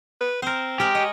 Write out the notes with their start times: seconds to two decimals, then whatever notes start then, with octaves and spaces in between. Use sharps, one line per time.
0.21 B4
0.42 C4 A#4 C5
0.80 G#3 G4 A#4
0.95 C#5 D#5